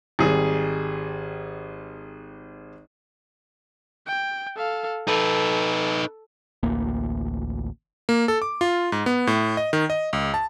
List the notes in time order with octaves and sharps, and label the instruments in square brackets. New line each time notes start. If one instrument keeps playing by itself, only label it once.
[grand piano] G#1 G3 G#4
[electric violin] G5
A4 F5
[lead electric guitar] D#4 B4 [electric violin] A4
[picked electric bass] A1 D2 A#3
[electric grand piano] A#3
A4
D6
F4
G#2
B3
A2
D#5
D#3
D#5
C#2
A5